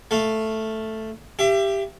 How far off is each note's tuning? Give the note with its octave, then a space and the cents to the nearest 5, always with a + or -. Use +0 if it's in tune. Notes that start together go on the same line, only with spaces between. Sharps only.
A3 +0 F5 +0
G4 +5 E5 +35